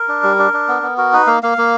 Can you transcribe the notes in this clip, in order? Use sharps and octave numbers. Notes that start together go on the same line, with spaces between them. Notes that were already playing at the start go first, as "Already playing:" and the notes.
Already playing: A#4
D4
G3
D4
D4
B3
B3
F#4 A#4
D#4 B4
A#3 F5
A#3 F5
A#3